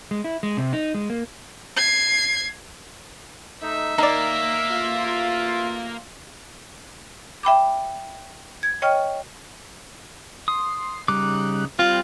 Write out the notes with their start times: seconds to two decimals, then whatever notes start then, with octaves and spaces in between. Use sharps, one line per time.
0.11 G#3
0.24 E4
0.43 G#3
0.57 C3
0.73 D#4
0.94 G#3
1.10 A#3
1.77 G#6 C7
3.62 A3 D#4 E5
3.98 D#3 A#3 D#4 D5
4.71 A1 F4
7.43 E5 G5 B5 D6
8.63 G#6
8.82 C#5 D#5 G5 C#6 F6
10.48 C6 D#6
11.08 C#3 G3 D#4 D6 F#6
11.79 G3 C4 F4